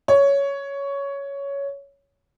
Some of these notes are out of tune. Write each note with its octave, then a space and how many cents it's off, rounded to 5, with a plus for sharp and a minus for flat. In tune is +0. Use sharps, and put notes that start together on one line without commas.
C#5 +10